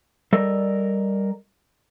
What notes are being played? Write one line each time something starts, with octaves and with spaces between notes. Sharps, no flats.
G3 A4 A#4 D5 D#5